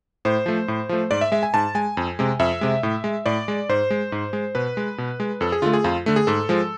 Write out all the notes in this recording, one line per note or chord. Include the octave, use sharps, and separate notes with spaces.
A2 C5
F3 A3
A2
F3 A3
G#2 D5
E5
G#3 E5
G#5
G#2 A5
G#3 G#5
F2
C3 G#3
F2 E5
C3 G#3
A2
G#3
A2 D5
G#3
G#2 C5
G#3
G#2
G#3
B2 B4
G#3
B2
G#3
F2 A4
G#4
D3 A3 F4
G#4
F2 F4
D3 A3
G#4
G#2 A4
F3 G#3